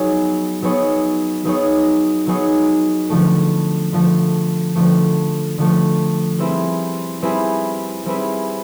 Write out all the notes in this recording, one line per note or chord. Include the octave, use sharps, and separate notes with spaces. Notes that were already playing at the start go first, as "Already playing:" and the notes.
Already playing: F#3 B3 D#4 G#4 C#5
F#3 B3 D#4 G#4 C#5
F#3 B3 D#4 G#4 C#5
F#3 B3 D#4 G#4 C#5
D3 F3 A3
D3 F3 A3
D3 F3 A3
D3 F3 A3
G3 C4 E4 G#4 B4
G3 C4 E4 G#4 B4
G3 C4 E4 G#4 B4